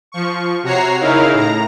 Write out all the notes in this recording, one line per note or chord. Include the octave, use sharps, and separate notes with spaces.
F3 C#6
C3 F#4 C#5 A#5 C7
C#3 D#4 E4 A#4 C#5 F5
A2 A#5